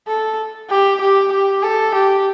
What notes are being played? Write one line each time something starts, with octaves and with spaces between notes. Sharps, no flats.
A4
G4
G4
G4
A4
G4